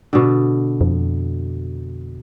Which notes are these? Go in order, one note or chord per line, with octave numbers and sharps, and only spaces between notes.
B2 D3
F2